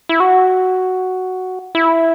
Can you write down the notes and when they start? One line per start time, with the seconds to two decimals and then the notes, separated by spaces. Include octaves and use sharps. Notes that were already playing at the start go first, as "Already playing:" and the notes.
0.09 E4
0.20 F#4
1.75 E4